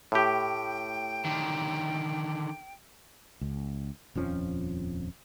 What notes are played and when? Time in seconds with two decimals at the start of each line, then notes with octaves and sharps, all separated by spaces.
0.12 A2 G4 G5
1.25 D3 D#3
3.41 C#2
4.15 D#1 F2 F3 C#4